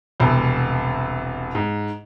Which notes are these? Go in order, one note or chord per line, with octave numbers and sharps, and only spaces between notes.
E1 C2 C3
G#2